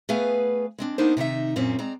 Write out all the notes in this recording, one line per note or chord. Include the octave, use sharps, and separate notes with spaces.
A3 B3 G#4 B4 F5 G#5
G#3 C4 D4
A#3 B3 D4 D#4 A#4 C5
C3 D#3 D#4 E5
F#2 A#2 C4 C#4
G#3 C4 D5 A#5